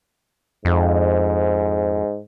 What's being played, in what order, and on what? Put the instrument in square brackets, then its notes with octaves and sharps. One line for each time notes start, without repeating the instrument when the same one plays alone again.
[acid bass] F2 [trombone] G#2